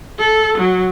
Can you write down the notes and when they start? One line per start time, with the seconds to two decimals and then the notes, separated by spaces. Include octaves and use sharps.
0.20 A4
0.57 F#3